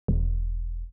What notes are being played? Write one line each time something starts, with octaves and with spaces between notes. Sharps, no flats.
E1